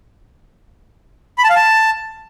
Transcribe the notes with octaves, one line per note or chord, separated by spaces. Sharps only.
B5
A5
F5
A5